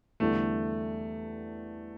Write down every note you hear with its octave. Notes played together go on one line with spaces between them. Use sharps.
E2 D3 G3 A3